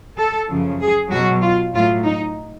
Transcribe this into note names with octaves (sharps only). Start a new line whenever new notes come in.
A4
F#2 C#3 F3
G#4
B2 F#3 F#4
F4
A2 F#3 F4
D#4